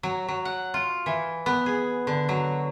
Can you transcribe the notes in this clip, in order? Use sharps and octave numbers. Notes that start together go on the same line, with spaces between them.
F#3
F#3
F#5
F4
E3
B3
G#4
D3
F#3